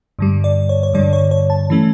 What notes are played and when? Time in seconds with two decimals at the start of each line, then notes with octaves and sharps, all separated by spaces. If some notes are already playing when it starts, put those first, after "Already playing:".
0.19 G2 D3 G3
0.44 D5
0.69 C#5
0.83 C#5
0.94 G2 D3 G3 D5
1.13 C#5
1.31 C#5
1.50 A5
1.70 E3 A3 C#4